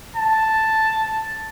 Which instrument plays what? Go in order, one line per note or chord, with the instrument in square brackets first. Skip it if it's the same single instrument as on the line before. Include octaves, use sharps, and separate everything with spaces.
[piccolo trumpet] A5